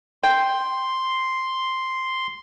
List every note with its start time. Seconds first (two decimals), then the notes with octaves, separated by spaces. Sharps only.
0.23 G5 C6